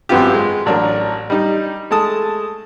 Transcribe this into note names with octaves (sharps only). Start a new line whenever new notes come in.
G#1 F#2 B3 C4 F4 G4
G#3
A1 F#3 D4 A#4
G3 D#4
G#3 A3 A5 D#6